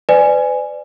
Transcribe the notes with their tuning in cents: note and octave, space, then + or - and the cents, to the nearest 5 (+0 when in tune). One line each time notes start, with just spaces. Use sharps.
B4 +40 D5 +10 G#5 +0